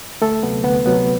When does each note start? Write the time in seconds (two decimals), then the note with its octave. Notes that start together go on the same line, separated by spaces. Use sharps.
0.22 D2 A3 A4
0.43 C3 F#3 B3
0.64 D2 B3 B4
0.86 C3 F#3 B3